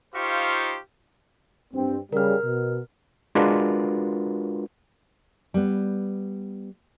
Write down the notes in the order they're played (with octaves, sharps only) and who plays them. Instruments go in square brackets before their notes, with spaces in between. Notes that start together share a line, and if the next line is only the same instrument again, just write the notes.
[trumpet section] D#4 F4 G4 C5 F5 C#6
[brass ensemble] G2 C4
[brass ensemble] C#3 G3 [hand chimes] A#4 F6
[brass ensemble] B2
[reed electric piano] G#3 D4 F4 F#4 A#4 B4
[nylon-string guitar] G3 B3